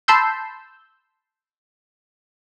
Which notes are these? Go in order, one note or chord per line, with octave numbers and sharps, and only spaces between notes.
A5 B5 C6 E6 G6